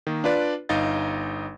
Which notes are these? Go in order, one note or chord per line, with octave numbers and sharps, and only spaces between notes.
D#3 A#3
D4 F4 B4 D5
G1 D#4 D#5 F5 A6